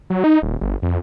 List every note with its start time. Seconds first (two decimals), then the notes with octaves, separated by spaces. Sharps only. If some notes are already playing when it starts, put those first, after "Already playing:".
0.10 F#3
0.24 D#4
0.42 D#1
0.61 G1
0.82 F2